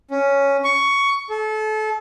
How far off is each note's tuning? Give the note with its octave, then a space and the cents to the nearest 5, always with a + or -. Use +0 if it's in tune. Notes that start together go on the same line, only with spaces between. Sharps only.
C#4 +5
C#6 +10
A4 -30